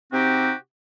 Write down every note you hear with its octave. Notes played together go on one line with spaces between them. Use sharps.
C3 C4 D#4 F#4 G4